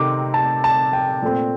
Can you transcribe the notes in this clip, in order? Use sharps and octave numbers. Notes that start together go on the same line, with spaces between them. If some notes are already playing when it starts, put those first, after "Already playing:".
Already playing: C3 D#3 A3 C4 D6
A5
A5
G5
A#2 A3 C4